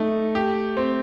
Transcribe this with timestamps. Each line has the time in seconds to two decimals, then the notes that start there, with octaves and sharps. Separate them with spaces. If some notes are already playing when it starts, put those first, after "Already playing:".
Already playing: A3 D#4
0.35 G4
0.77 C4